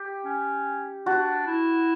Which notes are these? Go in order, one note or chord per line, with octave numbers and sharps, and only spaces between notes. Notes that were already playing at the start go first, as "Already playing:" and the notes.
Already playing: G4
C#4
D4 F#4
E4